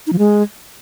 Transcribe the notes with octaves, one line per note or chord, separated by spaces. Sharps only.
D#4
F3
G#3